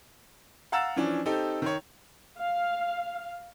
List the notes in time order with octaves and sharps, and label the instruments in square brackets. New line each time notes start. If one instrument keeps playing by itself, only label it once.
[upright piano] F5 F#5 A#5 E6 A6 E7
E3 F3 C#4 D4
C4 D#4 G4 A4
D#3 C#5
[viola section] F5